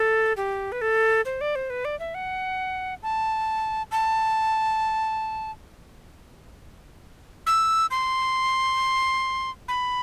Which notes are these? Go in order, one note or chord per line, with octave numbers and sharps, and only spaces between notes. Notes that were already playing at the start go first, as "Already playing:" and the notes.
Already playing: A4
G4
B4
A4
C5
D5
C5
B4
D5
E5
F#5
A5
A5
E6
C6
B5